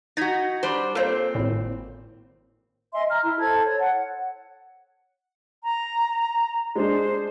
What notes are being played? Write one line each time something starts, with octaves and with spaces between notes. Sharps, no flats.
D#4 F#4 G#6 B6
G3 D4 C5
A#2 C4 A4 C5
G#1 A2
D#5 E5 G#5 C6
A#5 F6
E4
A4 C5 A5 G#6
C#5
F#5
A#5
G#3 D4 C5